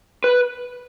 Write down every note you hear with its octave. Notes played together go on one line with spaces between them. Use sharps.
B4